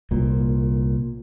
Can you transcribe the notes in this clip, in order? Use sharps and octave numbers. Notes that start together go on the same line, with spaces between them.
C2 A#2